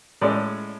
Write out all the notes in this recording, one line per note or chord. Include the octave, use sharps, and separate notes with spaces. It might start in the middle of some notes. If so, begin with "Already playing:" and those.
A2 G#3 C#4 D5